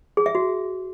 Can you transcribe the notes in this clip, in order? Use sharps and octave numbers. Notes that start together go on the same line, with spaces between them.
G#4
E5
F#4